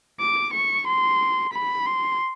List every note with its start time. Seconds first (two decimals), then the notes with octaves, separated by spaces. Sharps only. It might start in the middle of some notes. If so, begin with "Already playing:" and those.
0.20 D6
0.53 C#6
0.87 C6
1.53 B5
1.86 C6